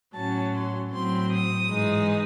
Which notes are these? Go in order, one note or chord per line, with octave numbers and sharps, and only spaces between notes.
A2 F#3 C#4 A5
C6
A2 F#3 C4 C6
D#6
G#2 E3 G#3 D#4